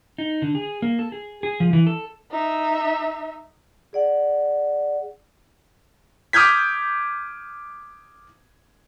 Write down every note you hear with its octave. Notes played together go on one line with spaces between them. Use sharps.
D#4
D3
G#4
A#3
A4
G#4
G#4
F3
E3
A4
D#4 E5
G#4 D5 F#5
D6 D#6 F6 G6 G#6 B6